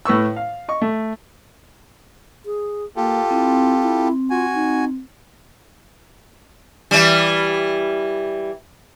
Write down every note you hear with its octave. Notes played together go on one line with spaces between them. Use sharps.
A2 B4 C#6 E6
F5
D#5 C#6
A3
G#4
A#3 F4 G4 A4
C4 E4
E4
F4 F#4 G#5
D#4
E3 G3